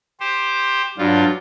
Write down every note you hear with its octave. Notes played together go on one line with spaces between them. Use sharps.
G4 C5
G2 F#3 D4 F4